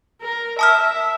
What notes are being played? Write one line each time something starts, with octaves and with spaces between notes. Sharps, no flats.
A#4
E5 A5 D#6 F6